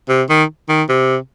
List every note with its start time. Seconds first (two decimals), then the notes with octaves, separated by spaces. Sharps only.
0.09 C3
0.30 D#3
0.69 D#3
0.89 C3